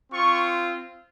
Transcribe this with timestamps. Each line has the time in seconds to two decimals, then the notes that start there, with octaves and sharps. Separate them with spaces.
0.12 C4 F4 C#6